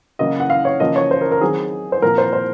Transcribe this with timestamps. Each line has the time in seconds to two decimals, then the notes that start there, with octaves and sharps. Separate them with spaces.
0.19 C#3 F#3 A#3 D#5
0.40 F#5
0.50 F5
0.65 C#5
0.80 C#3 F3 A#3 D#5
0.96 C#5
1.11 C5
1.21 A#4
1.32 A#4
1.41 D#3 F#3 C4 G#4
1.92 C5
2.02 A#2 F3 C4 A#4
2.18 C5
2.33 C5